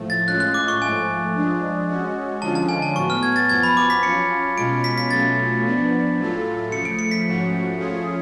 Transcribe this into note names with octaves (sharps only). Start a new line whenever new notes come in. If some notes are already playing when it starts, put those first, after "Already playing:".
Already playing: A2 F3 A3
A6
A2 G#3 C#4 F4 F#6
F#6
D6
C#6
G#2 F3 A3 G#5
F3 G#3 D4
G#3 C#4 F#4
D3 F3 G#3 C#4 F4 A5
A5
G#5
A5
A2 F#3 B3 C#6
F6
G#6
A6
F#2 F3 B3 G#6
B5
D6
B6
F#3 C#4 F4 C#7
B2 G#3 C#4 F4 D7
B6
B6
B2 F#3 A3 C#4 F4 A6
F3 B3 D4
A2 F#3 A3 F4 A4
C#3 F3 A3 C#7
D7
C#7
B6
G#2 F3 A3 C#4 F#4
F3 A3 C#4 F4 G#4